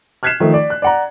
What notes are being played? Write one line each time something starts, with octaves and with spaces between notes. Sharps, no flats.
F6 F#6 G#6 B6 C7 E7
D#3 F3 A3
D5
F#6
D5 F#5 A#5